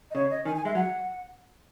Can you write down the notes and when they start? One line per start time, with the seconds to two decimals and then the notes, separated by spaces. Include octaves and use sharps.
0.11 D#5
0.15 C#3 C#5
0.30 D#5
0.45 D#3 G#5
0.55 G#5
0.65 G#3 E5
0.75 F#3 F#5